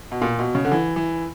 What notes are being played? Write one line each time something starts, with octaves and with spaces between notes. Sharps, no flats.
B2
A#2
B2
C#3
D3
E3
E3